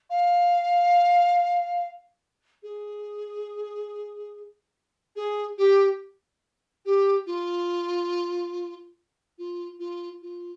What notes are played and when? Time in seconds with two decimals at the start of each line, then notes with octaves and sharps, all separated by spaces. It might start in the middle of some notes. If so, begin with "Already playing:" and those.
0.10 F5
2.62 G#4
5.15 G#4
5.58 G4
6.85 G4
7.26 F4
9.38 F4
9.79 F4
10.22 F4